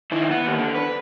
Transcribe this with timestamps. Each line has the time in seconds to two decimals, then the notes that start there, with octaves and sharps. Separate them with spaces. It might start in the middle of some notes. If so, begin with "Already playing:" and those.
0.12 D#3 E4
0.31 B3
0.46 D#2
0.58 D3
0.75 B4